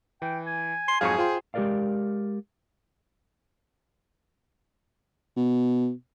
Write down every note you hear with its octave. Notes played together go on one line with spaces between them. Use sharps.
E3 G5
G#5
C6
F2 G#2 F#3 G#4 F5 C#6
F4 C5 G5 C6
G#3 G4 G#4 A#4 D5 F5
B2